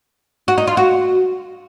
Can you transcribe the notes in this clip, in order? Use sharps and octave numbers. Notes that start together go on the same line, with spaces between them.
F#4
D#4
F4
F#4